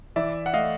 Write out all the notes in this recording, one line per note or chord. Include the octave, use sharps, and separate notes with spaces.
E3 D5 E5
F#5
A3 D#5 F5